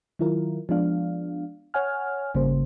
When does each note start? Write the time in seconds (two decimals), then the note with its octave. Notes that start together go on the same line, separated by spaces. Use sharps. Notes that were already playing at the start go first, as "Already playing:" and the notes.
0.19 D#3 F#3 E4 F4 A#4
0.69 F3 G#3 B3 D4 F5
1.74 C#5 F#5 G#5 F6
2.35 G#1 C#3 G3 A#3 C5